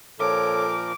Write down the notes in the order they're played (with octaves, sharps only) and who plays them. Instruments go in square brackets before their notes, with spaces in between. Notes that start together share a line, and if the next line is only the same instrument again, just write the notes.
[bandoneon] A#2 F3 A#4 [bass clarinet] A4 [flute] C#5 [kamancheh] D6